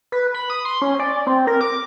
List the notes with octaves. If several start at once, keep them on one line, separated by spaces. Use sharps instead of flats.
B4
B5
D#6
C6
C#4
D5
C4
A#4
D6